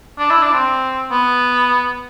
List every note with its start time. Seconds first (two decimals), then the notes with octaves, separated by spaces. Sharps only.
0.19 D4
0.30 E4
0.42 D4
0.54 C4
1.11 B3